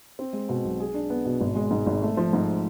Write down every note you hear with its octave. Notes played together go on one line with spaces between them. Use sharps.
C4
G#3
B2
B1
G#4
D4
B3
B2
G#1
G#3
G#2
G#1
A3
F3
G#2